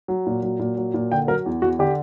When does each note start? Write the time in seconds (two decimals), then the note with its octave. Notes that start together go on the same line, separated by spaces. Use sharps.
0.08 F#3
0.27 A#2
0.43 F#3
0.59 A#2
0.77 F#3
0.94 A#2
1.12 D3 G5
1.28 F#3 A#4
1.46 E2
1.62 E2 F#4
1.79 D3 G4